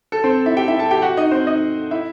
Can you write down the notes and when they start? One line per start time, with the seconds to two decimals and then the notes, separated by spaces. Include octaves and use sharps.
0.12 A4
0.24 C4 C5
0.46 E4 E5
0.57 G4 G5
0.68 E4 E5
0.79 A4 A5
0.91 G4 G5
1.02 F#4 F#5
1.17 D#4 D#5
1.31 C4 C5
1.47 D#4 D#5
1.91 E4 E5